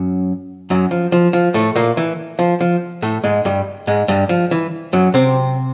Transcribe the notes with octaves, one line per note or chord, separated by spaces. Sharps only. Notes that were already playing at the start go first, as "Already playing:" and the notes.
Already playing: F#2 F#3
F#2 F#3
F3
F3
F3
A2 A3
A#2 A#3
E3
F3
F3
A2 A3
G#2 G#3
G2 G3
G#2 G#3
G2 G3
F3
E3
F#2 F#3
C3 C4